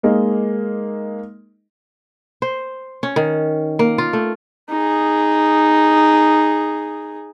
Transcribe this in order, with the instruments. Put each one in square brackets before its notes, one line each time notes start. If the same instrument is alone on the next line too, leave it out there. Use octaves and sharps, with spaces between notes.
[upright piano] G#3 A#3 D#4
[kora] C5
C#4
D#3
A#3
F4
A3
[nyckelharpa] D#4 G#4